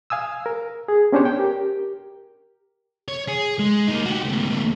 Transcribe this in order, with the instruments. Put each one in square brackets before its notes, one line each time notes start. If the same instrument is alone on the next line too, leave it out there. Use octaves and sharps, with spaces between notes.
[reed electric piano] F5 G#5 D#6 E6
A#4
G#4
B3 C#4 D4 G4 C5 C#5
G5
G4 A#4
[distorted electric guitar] C#5
G#4
G#3
A#3 D#4
F#4 G4
C#2 A2